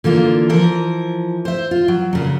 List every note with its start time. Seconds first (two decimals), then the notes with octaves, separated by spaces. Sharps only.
0.04 D3 E3 A#3 F4
0.49 E3 F3 A#4
1.45 C5 E5
1.71 F4
1.88 F#3
2.13 A#2 C#3 F#3